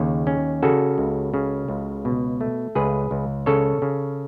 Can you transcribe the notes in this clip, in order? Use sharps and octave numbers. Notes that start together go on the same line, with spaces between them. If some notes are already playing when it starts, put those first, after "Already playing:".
Already playing: D#2 C#3
C#4
C#3 F#4 A4
C#2
C#3
C#2
B2
A3
C#2 G#4 B4
C#2
C#3 A4 C#5
C#3